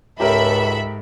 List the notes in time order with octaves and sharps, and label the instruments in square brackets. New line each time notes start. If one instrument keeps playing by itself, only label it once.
[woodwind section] C#2 [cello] G#2 [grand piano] G4 A#4 [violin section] A4 E5 B5